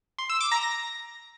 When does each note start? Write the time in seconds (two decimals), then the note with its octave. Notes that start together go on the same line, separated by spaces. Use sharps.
0.18 C6
0.30 E6
0.41 D6
0.52 A#5
0.63 A#6